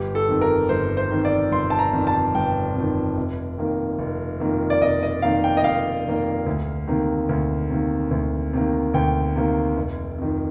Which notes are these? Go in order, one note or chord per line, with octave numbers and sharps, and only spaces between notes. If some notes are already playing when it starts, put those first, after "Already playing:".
Already playing: G1 G4
A4
F2 D#3
A#4
G1 C5
C5
F2 D#3
D5
G1 C6
A5
A#5
F2 D#3
A5
G1 G5
F2 D#3
F1
F2 D#3 A#3
F1
F2 D#3 A#3
D5
F1 D#5
D#5
F2 D#3 A#3 F5
G5
D#5
F1 F5
F2 D#3 A#3
D2
C3 D#3 A#3
D2
C3 D#3 A#3
D2
C3 D#3 A#3
D2 G5
C3 D#3 A#3
F1
F2 D#3